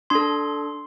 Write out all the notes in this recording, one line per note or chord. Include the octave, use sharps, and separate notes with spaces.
D4 A4 C6